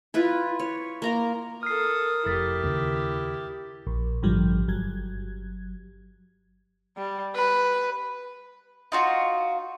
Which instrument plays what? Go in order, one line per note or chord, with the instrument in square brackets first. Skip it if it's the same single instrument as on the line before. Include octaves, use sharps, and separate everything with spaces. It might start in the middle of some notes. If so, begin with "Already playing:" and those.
[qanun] E4 F4 B4
C#5
A#3 A#5 C6
[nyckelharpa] A4 D#6 [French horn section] A#4 [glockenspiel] F6 C7
[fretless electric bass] F1 [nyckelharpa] E4 G4 [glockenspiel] D#6 A6 B6
[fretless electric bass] D#2 C#3
[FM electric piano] A#1
A1 G2 D3 F3 G3
G1 F#3 G#6
[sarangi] G3
B4
[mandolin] D#4 F4 F#4